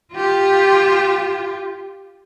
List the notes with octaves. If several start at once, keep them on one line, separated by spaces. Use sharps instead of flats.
F4 G4